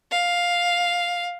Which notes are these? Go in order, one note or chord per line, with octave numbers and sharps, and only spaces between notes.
F5